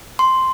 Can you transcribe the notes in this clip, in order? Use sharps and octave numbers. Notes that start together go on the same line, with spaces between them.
C6